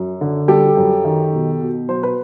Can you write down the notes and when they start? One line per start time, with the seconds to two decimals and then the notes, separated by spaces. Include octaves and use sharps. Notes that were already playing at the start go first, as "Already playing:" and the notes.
Already playing: F#2
0.21 D3
0.48 G3 G4 A4
0.77 F#2
1.05 D#3
1.33 B2
1.61 B2
1.89 F#3 C5
2.03 B4